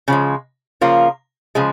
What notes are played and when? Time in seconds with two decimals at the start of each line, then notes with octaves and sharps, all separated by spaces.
0.08 C#3 F3 G#3
0.81 C#3 F3 A#3 F4
1.55 C#3 F3 G#3